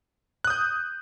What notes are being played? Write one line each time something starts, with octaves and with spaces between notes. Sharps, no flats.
D#6 F#6 G6